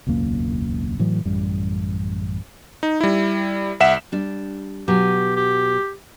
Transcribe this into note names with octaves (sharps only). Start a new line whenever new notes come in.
E1 C#2 F#2 A#3
A2 E3 F#3
A1 F#2 G3
D#4
G3 E4
C2 E5 F#5 B6 E7
G3 D4
B2 F#3 G4 G#5
G4